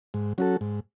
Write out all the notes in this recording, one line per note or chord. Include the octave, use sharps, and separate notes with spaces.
G#2
F#3 C#4 F#4 A4
G#2